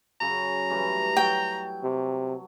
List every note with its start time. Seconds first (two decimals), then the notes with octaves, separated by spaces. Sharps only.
0.21 F#2 C#3 A#5 B5
0.70 G2 E3 A3
1.17 F#3 G5
1.84 C3